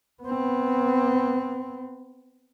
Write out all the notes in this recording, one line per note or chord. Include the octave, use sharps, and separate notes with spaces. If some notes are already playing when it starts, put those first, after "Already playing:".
B3 C4